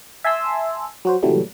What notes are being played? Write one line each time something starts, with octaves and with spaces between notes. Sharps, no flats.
E5 G#5 A5 C6 E6
F#3 F#4 C5
A#2 C#3 E3 F#3 G3 A3